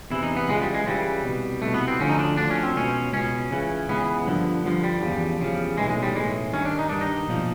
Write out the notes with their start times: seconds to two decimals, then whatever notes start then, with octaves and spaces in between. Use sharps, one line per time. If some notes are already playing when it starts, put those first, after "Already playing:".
0.10 E2 C3 E3 E4
0.23 D#4
0.37 B3
0.48 C#2 C#3 E3 G#3
0.61 G3
0.74 G#3
0.86 C#2 C#3 E3 G3
1.24 C2 B2
1.62 C2 B2 A3
1.74 B3
1.88 C4
1.99 D2 D3 F3 C#4
2.09 D#4
2.19 D4
2.37 D2 D3 F3 D4
2.51 C#4
2.63 C4
2.76 C#2 B2 C#4
3.13 C#2 B2 C#4
3.51 C#2 C#3 E3
3.88 C#2 C#3 E3 B3
4.26 G2 D3 F3
4.64 G2 D3 F3
4.84 G3
5.02 E2 C#3 F3
5.40 E2 C#3 F3
5.78 B1 A2 E3 G#3
5.90 G#3
6.03 G3
6.15 B1 A2 E3 G#3
6.53 G2 D#3 C#4
6.65 D4
6.79 D#4
6.89 G2 D#3 D4
7.01 D#4
7.28 B1 A#2 F3